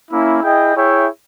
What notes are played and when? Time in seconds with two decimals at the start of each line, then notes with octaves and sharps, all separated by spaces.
0.11 A#3 C#4 E4
0.42 E4 G#4 D#5 G5
0.74 E4 G#4 C#5 E5 G5